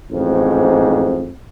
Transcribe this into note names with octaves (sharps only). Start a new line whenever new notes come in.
A1 F2 G#2